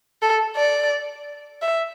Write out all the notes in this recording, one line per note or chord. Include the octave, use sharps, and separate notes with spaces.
A4
D5
E5